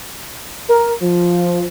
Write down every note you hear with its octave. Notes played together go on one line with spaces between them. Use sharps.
A#4
F3